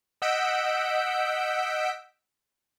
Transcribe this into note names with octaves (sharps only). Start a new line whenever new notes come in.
D#5 F#5 E6 G6 B6 D7